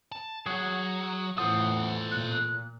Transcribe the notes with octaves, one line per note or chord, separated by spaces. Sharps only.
A5
F#3 F#4 G#4
A2 E3 F4 A4 C5 F#5 D#6
A#2 F#6